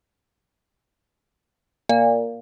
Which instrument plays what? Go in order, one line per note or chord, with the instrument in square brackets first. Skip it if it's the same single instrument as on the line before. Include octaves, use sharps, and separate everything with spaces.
[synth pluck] A#2